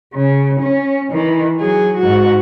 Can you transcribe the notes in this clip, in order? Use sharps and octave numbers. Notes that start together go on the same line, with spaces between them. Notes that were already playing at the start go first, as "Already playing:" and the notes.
C#3
C#4
D#3 E3
F#3 G#4
G#2 F#4